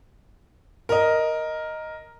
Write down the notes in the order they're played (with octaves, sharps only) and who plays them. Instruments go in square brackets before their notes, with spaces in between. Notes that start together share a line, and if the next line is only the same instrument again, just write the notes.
[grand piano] A#4 D#5